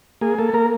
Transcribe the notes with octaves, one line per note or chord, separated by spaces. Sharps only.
A#3 G#4
A#3 A4
A#3 A#4